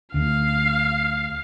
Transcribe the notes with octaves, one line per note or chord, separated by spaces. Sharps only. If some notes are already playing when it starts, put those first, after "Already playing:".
D2 F5